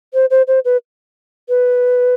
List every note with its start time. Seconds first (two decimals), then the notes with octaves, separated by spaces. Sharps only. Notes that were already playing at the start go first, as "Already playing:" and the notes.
0.14 C5
0.30 C5
0.47 C5
0.65 B4
1.49 B4